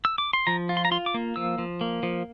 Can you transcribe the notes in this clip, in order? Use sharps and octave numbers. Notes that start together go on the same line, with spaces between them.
E6
D6
C6
F3 A#5
F4
C6
A#5
F4 C6
D6
A#3
F3 E6
F3
A#3
F3